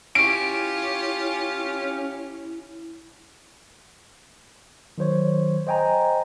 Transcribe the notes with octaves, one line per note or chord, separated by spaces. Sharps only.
C#4 E4 F4 G4 D7
D#3 F#3 C5 C#5
C5 D#5 G5 G#5 A#5